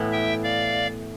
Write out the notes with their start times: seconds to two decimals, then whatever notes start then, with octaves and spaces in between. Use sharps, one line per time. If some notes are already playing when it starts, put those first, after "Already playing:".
Already playing: A2 E3 B3 E4
0.11 E5 G5
0.43 D5 F5